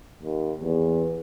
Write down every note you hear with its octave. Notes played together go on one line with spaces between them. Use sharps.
D#2
E2